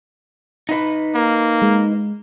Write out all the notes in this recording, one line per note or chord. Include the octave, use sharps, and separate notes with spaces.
D#4 B4
A#3
G#3